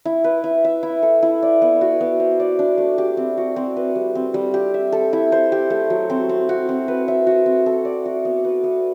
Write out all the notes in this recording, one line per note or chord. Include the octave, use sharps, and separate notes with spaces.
E4
B4
E4
E5
E4
A4
E4
D5
B3
F#4
B3
C5
D5
D4
A3
G4
C4
F#4
C4
B4
G3
C4
G3
G4
E5
A4
E4
C5
G4
A3
F#3
C4
C4
F#4
C4
B4
E5
F#4
C4
A4
D5
F#4
B3
B4
B3